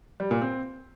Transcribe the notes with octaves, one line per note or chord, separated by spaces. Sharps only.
G3
A#2
C4